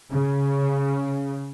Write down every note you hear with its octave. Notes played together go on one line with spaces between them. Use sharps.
C#3